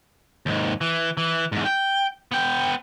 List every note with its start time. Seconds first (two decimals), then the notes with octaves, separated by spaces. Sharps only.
0.46 D#2 G#2
0.81 E3
1.17 E3
1.52 E2 G#2
1.65 G5
2.32 B3 G5